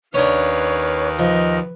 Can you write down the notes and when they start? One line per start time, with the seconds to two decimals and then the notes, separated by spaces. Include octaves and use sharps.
0.14 D#2 D#3 C#4 D4 B4 C#5 F5
1.19 F3 B4 D#5